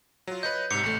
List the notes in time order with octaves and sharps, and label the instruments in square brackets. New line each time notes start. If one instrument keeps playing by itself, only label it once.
[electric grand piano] F#3 F4
[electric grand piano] B4 C#5 D#5 [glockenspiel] G6
[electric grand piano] G#2 C3 [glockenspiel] C#7 F7
[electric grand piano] A1 A3